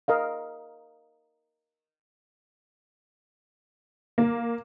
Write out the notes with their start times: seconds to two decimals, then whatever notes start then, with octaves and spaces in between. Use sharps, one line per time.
0.08 A#4 D#5 F5
4.18 A#3